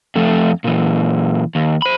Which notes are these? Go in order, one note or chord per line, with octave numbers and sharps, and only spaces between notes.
F2 A3
A#2 E3
D#2
C5 B5